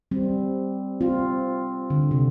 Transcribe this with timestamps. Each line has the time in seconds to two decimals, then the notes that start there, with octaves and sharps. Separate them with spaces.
0.11 G3 C4
1.01 C4 F4
1.90 D3
2.11 C3